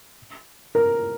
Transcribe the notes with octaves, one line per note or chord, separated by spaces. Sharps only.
A#4